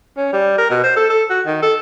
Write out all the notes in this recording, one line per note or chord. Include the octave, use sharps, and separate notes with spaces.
C#4
G3
A#4
B2
C5
A4
A4
F#4
D#3
A4